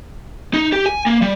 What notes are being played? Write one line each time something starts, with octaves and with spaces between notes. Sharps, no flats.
D#4
G4
G#5
A#3
G3